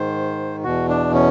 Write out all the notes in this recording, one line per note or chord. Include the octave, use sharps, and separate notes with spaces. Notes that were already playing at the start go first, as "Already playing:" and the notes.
Already playing: G#2 D#3 C5
E2 B2 F#4
D4
C#4